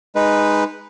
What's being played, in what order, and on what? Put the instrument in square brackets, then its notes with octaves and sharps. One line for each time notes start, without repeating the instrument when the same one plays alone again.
[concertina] G#3 D#4 B4